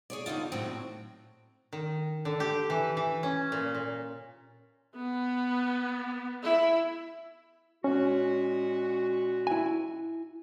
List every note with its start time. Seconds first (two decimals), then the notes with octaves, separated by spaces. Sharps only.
0.10 G#4 C#5 D5
0.26 D3 B3 D#4 F4
0.52 E2 A2 F#3 C4 F#4 G5
1.73 D#3
2.25 D3
2.40 G4
2.70 E3
2.97 E3
3.23 C#4
3.52 A#2
3.75 A#2
4.95 B3
6.43 E4
7.84 A#2 G#3 C#4 F#4
9.47 E4 G#5